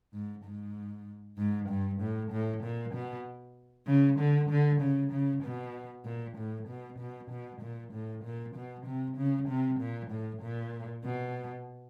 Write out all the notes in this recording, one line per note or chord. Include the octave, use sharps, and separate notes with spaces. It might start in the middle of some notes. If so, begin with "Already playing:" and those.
G#2
G#2
G#2
G2
A2
A2
A#2
B2
C#3
D3
D3
C#3
C#3
B2
A#2
A2
B2
B2
B2
A#2
A2
A#2
B2
C3
C#3
C3
A#2
A2
A#2
B2